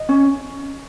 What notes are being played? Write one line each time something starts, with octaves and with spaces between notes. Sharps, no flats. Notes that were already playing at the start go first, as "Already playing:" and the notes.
Already playing: D#5
C#4